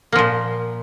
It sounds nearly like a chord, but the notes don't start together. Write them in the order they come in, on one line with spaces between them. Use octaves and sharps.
A#3 F3 A#2